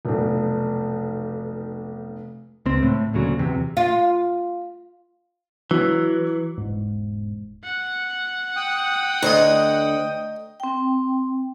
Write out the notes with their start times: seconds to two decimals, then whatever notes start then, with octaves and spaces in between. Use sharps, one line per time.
0.05 F1 B1
2.66 C#2 C4
2.83 A2
3.13 D2 A#2 C#3 F#3
3.39 E2 C3
3.77 F4
5.71 E3 F#3
6.58 E1 G#2
7.64 F#5
8.56 G5 D#6
9.23 D2 D#5 A#5 C#6
10.60 C4 G5